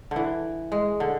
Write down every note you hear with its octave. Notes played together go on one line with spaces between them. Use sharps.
D3 E3
G#3
D3